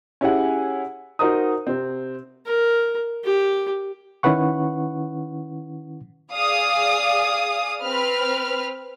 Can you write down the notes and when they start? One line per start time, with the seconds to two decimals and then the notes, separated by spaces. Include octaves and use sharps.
0.21 C#4 E4 G4 G#4 F#5 G#5
1.19 D#4 F#4 A#4 C5 A#5 D#6
1.67 C3 C4
2.46 A#4
3.25 G4
4.23 D#3 C#4 E4 B4 F#5 C#6
6.32 G#4 D5 F5 D#6
7.83 C4 B4 F6